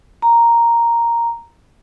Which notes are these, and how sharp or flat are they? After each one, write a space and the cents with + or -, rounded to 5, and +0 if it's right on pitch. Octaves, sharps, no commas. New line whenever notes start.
A#5 +0